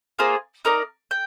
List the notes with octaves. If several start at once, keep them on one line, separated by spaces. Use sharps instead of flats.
A#3 F4 G#4 C5
D#4 A#4 D5
G5